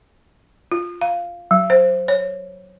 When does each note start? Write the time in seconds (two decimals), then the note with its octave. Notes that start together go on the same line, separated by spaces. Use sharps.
0.72 F4
1.01 F5
1.51 F#3
1.70 C5
2.08 C#5